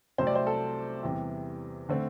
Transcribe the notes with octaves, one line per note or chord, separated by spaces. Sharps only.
C2 C3 F#3 A3 C5
D5
C5
A4
E2 C3 G3
D3 A3 C4